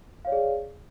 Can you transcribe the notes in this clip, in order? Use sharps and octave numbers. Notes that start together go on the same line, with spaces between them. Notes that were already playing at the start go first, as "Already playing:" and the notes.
G#4 C#5 D5 F5